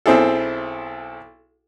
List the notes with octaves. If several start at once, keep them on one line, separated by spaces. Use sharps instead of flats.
B1 C4 E4 G#4 A4